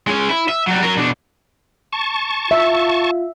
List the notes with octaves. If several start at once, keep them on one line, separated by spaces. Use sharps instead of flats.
G#3 C#4
E4
E5
F#3 G3
F#3 A#4
B2 D4
A5 C#6
F4 E5